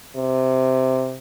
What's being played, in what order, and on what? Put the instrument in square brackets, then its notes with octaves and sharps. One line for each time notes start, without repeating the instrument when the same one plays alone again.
[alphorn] C3